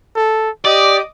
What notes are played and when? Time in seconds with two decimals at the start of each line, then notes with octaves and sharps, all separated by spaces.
0.16 A4
0.65 G4 D5 D#5 D6 D#6